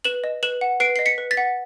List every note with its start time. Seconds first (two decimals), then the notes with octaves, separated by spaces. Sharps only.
0.05 B4 E7 F#7
0.24 D#5
0.43 B4 E7 F#7
0.61 F#5
0.80 B4 C7 D7
0.96 D#5 C7
1.06 B6 C#7
1.18 B4
1.31 A6 B6
1.37 F#5